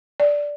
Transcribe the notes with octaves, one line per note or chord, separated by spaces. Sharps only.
D5